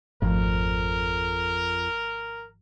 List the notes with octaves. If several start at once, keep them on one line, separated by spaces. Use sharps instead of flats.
G#1 F2 F3 A3 A#4